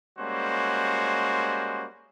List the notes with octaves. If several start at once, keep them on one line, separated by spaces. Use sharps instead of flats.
G3 G#3 A#3 C#4 F#4 C5